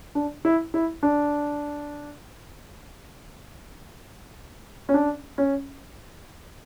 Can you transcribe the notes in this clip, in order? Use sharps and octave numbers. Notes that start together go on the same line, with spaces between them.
D4
E4
E4
D4
C#4
D4
C#4